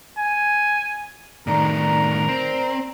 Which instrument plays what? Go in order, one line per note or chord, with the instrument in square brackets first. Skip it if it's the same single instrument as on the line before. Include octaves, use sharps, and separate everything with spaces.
[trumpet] G#5
[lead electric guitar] A2 D#3 [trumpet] A#4 [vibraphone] D5 A#5
[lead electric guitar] C4